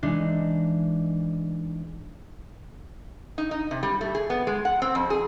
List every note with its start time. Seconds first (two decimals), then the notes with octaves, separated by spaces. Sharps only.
0.03 E3 G#3 D4 D#4
3.38 D#4
3.51 D#4
3.71 C3
3.83 G3
4.01 A3
4.15 G#4
4.30 B3
4.47 G#3
4.65 F#5
4.82 C4
4.95 F2
5.10 G#4